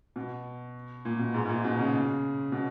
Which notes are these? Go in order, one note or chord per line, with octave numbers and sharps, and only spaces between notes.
B2
A#2
B2
G#2
G#2
A#2
B2
C#3
B2